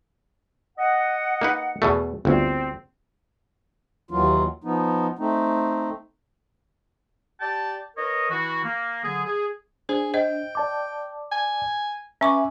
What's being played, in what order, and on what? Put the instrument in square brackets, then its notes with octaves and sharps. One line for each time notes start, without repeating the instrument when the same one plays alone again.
[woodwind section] D#5 F#5
[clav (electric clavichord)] A#3 D#4 B4
E2 B2 A3
[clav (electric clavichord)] G1 D2 [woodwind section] C4
[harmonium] D#2 E3 F#3 F4
F3 B3 D#4
A3 C4 D#4
[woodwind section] G4 D5 G5 A5
A#4 B4 C#5 D#5
E3 E4 F#4
A#3
D3 F#3 G#4
G#4
[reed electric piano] D4 [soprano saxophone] G#4 [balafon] C5
[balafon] C5 D#5 [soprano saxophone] G5
[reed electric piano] D5 A5 D6
[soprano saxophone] G#5
[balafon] C#4 C#6 D6 [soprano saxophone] B4 [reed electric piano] E5 G#5